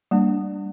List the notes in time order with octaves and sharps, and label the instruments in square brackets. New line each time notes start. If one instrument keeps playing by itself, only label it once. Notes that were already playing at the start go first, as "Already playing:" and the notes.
[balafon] G3 A#3 D4